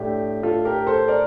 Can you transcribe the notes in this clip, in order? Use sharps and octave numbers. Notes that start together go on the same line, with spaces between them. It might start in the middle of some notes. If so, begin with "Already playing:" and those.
Already playing: A2 A3 D4 G4
F4 A4
G4 A#4
A4 C5
A#4 D5